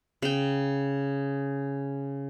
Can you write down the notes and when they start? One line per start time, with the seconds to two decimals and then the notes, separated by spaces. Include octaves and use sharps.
0.22 C#3 G5